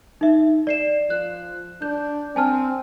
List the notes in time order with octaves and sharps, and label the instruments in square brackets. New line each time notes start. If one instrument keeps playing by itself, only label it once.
[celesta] D#4 E5
D5 C7 E7
[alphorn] F3 [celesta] F#6
[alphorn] D4 [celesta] G6
[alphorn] C4 [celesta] G#5 A5 F6